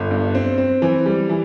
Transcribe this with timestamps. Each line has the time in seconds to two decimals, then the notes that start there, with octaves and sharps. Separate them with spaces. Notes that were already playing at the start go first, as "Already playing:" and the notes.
Already playing: G1
0.11 G2
0.35 C4
0.58 C4
0.82 E3
1.06 G3
1.29 E3